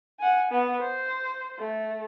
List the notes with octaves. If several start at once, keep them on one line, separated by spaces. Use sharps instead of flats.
F#5 G#5
B3
C5
A3